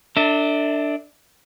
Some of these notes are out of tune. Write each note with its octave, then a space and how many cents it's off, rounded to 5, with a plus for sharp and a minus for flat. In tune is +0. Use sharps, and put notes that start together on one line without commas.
D4 +0 A4 +40 E5 -25